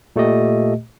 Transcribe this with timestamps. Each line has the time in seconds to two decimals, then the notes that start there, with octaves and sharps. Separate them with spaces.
0.16 A#2 A3 G4 D#5